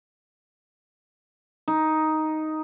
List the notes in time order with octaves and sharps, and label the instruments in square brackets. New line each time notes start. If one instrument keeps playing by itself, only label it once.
[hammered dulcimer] D#4